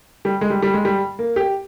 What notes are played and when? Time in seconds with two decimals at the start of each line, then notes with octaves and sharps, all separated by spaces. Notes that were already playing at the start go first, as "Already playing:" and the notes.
0.25 G3
0.41 G#3
0.50 G3
0.62 G3
0.74 G#3
0.85 G3
1.19 A#3
1.36 G4